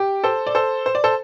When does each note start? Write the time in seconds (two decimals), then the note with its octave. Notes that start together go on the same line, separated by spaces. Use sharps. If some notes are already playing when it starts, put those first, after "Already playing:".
Already playing: G4
0.24 A4 C5
0.47 D5
0.55 A4 C5
0.86 C5
0.95 D5
1.04 A4 C5